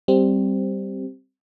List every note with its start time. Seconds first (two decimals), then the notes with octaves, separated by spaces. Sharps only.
0.08 G3 C4